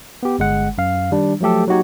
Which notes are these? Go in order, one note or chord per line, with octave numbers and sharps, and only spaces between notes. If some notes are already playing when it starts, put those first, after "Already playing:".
B3 G4
G1 G#3 F#5
F#2 F5
D#3 G3 D4
F3 F#3 A3 G4 A4
F#3 A#3 D#4 F#4 G4 C#5